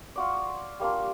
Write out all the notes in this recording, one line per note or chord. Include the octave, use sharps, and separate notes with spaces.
F4 F#4 D5
G3 A#3 D4 F4